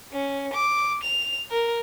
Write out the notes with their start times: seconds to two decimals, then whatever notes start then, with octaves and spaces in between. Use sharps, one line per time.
0.12 C#4
0.53 D6
1.03 F7
1.50 A#4